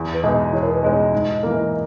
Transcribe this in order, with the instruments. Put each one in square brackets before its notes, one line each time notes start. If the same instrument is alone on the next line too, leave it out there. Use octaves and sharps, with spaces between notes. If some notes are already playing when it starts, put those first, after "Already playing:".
Already playing: [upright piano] E2
[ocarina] B4
[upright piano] B2 G#3 D#4 G#4
[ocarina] D#5
[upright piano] E2 [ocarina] C#5
[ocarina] A#4
B4
[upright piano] B2 G#3 D#4 G#4 [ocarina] C#5
[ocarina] D#5
[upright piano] G#2
E3 A#3